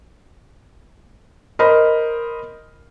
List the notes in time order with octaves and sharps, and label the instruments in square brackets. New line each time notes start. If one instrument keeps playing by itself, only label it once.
[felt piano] A#4 C5 D#5 B5